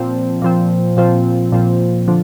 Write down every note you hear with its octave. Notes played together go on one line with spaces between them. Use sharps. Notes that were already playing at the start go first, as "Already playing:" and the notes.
Already playing: A#2 F3 C4
A#2 F3 C4
A#2 F3 C4 F4
A#2 F3 C4 F4
D3 F3